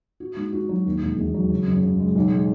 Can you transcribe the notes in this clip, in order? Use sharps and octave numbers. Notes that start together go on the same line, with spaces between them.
F#4
G#2
F#4
F#3
D#2
E1
E1
F#3
C#3
F#1
C#3
G#3
B1
G#3